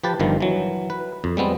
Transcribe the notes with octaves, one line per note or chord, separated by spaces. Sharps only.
F3 G4 B4 A5
G1 G2 D#3 F3
E3 F#3
B4
F2
G3 G#3 B3 C4